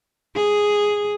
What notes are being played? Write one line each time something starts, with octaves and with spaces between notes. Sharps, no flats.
G#4